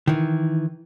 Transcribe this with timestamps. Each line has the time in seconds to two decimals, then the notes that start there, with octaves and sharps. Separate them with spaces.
0.07 D#3 E3